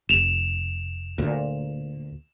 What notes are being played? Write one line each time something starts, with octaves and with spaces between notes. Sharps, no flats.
F1 E7 F7
D2 A#2